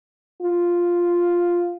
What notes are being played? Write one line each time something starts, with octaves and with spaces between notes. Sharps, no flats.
F4